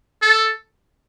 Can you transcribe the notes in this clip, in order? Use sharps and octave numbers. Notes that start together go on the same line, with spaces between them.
A4